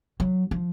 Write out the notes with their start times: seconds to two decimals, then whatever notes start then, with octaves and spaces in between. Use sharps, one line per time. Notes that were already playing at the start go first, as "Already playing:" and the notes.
0.20 F#3
0.51 F3